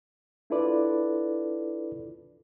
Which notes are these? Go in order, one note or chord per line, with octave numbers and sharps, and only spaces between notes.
D4 E4 F4 A4 B4 D5